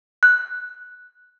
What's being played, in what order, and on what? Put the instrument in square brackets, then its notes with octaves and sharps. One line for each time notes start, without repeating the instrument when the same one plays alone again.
[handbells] F#6